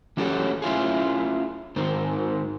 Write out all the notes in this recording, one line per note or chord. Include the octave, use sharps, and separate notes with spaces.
E3 C#4 F#4 G4 A4 C#5
C#4 E4 F4 G#4
G#2 D#3 C4